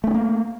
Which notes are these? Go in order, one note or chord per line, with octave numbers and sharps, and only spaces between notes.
A3 A#3 C#4 D4